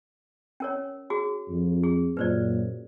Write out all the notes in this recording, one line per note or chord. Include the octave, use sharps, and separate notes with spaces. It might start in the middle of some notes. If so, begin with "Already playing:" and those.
C#4 A#4 C#5
F#4 G#4
F2
G#4
F#2 A#2 B4 C5 D5